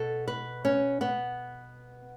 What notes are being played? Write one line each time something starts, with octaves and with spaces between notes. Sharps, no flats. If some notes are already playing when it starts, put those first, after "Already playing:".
Already playing: B2 A4
B4
C#4
B3